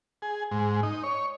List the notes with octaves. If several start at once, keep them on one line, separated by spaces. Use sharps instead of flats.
G#4
G#2
D#4
C#5